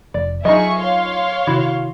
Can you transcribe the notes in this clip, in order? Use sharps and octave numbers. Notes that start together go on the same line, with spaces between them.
F1 D5
F#3 D#4 F4 G#4 D#5 E5 C#6
C#5 F5 C6
C3 D#3 E4 F#4